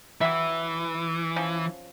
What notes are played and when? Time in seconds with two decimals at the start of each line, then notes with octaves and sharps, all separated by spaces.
0.21 E3 F#3 G4 E5
1.36 F3 C#4